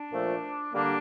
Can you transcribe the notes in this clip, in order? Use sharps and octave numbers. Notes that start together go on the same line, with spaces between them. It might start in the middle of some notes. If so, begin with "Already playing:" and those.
Already playing: D4
A#2 F3 A3
D3 G3 A#3 D4